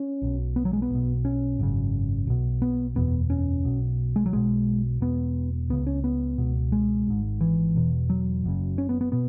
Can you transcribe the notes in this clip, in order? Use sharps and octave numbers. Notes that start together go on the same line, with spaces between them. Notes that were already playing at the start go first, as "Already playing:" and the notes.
Already playing: C#4
B1 B2
B3
F#3
G#3
B3
B1 B2
C#4
G#1 F#2 C#3
B1 B2
B3
F#1 E2 B2 B3
C#4
B1 B2
G#3
F#3
B1 B2 G#3
E1 E2 B2 B3
C#2 C#3 B3
C#4
B3
C#2 B2
G#3
G#1 G#2
E3
E1 E2 B2
F#3
F#1 F#2 C#3
C#4
B3
B3
B2 B3